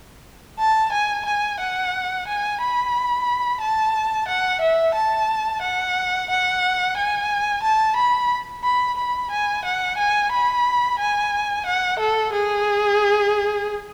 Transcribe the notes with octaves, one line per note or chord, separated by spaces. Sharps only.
A5
G#5
G#5
F#5
G#5
B5
A5
F#5
E5
A5
F#5
F#5
G#5
A5
B5
B5
B5
G#5
F#5
G#5
B5
G#5
F#5
A4
G#4